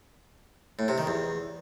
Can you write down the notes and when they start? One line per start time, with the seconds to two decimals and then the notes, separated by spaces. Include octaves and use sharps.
0.79 A2
0.88 C3
0.98 D#3
1.07 E2